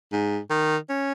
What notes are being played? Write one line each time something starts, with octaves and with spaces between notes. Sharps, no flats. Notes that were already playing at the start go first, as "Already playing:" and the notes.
G#2
D#3
C#4